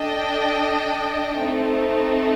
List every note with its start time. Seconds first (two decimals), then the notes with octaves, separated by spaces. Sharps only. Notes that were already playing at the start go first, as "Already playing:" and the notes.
Already playing: D4 A4 D#5 G5
1.40 A3 C4 D#4